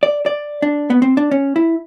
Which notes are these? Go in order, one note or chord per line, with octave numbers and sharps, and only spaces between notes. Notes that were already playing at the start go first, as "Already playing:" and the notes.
D5
D5
D4
B3
C4
D4
C#4
E4